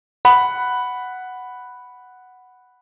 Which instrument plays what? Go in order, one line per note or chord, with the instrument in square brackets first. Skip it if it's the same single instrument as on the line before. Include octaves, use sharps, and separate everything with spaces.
[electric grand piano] F#5 B5